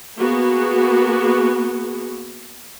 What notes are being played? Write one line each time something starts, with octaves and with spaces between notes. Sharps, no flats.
A#3 B3 F#4 G#4